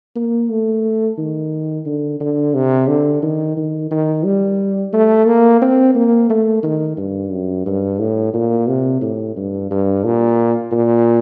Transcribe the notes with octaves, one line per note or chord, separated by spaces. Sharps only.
A#3
A3
D#3
D3
D3
C3
D3
D#3
D#3
D#3
G3
A3
A#3
C4
A#3
A3
D#3
G2
F#2
G2
A2
A#2
C3
A2
G2
G2
A#2
A#2